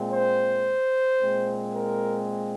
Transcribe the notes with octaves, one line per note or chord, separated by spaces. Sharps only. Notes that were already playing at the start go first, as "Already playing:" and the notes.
Already playing: A#2 G#3 C4
C5
A#2 G#3 C4
A#4